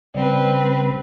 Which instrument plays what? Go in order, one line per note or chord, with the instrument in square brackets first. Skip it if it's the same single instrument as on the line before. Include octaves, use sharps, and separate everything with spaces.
[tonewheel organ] C#3 G3 [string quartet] C4 B4